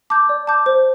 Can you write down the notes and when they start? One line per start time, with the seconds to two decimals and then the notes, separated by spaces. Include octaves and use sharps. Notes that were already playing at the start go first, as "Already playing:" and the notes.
0.10 A5 D6 G6
0.29 D5
0.47 A5 D6 G6
0.66 C5